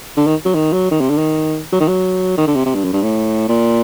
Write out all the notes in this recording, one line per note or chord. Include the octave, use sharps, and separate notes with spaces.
D3
D#3
F#3
D#3
F#3
D#3
C3
D3
D#3
F#3
D#3
F#3
D#3
D3
C3
C3
G2
F#2
G2
A2
A#2